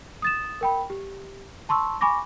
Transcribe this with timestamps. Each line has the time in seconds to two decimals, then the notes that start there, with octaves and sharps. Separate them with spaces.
0.22 D#6 A6 E7
0.61 A#4 G5 B5
0.90 G4
1.69 A5 C6 C#6 E6
2.01 G#5 B5 C#6 D6 A#6